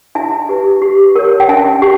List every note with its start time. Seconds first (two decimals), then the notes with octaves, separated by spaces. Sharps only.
0.15 E4 E5 G#5
0.49 G4 B4
0.82 G4
1.16 A#4 C#5
1.40 G5
1.48 C#4 E5 G#5
1.82 G4